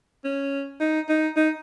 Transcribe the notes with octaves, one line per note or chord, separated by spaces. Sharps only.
C#4
D#4
D#4
D#4